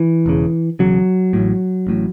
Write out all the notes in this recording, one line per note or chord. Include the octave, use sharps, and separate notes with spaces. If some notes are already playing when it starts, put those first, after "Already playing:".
Already playing: E3
E1 E2 C#3
E1 E2 C#3 F#3
A1 A2
A1 A2